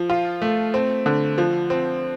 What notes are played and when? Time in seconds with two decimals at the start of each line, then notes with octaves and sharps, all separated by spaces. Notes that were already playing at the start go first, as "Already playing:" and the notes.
Already playing: F3
0.10 F4
0.42 A3
0.74 C4
1.06 D3
1.38 F3
1.70 C4